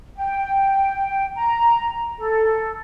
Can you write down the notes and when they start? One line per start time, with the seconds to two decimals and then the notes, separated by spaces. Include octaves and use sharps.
0.17 G5
1.36 A#5
2.18 A4